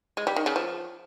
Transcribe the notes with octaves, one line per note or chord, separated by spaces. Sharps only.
G#3
G3
D#3
C#3
F3